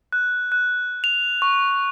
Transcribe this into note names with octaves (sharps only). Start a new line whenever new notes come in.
F#6
F#6
F7
C#6